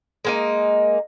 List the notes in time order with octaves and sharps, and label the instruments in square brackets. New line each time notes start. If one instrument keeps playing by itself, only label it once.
[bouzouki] G#3 A#3 D#4